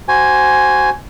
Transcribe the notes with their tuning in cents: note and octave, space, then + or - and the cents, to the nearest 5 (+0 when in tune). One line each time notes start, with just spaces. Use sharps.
F#4 +25 C5 +0 G#5 +0